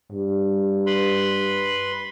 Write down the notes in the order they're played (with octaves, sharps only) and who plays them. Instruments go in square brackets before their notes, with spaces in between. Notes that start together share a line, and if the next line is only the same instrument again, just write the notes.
[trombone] G2
[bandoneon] B4 B5 C6